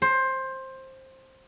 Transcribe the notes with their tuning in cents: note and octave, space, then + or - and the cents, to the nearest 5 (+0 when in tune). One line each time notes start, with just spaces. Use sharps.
C5 +15